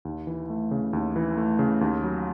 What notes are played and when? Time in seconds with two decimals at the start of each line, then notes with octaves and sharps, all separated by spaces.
0.05 D#2
0.27 E3
0.50 A3
0.71 C#3
0.93 D#2
1.16 E3
1.37 A3
1.59 C#3
1.81 D#2
2.04 F#3